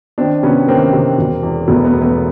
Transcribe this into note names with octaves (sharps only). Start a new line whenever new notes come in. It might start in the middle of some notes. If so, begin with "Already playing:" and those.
D#3 C4 D4
C3 B3 C#4
D#3 A#3 C4
C3
E1
E2
E1 A3 B3
A3 B3
E2
A3 B3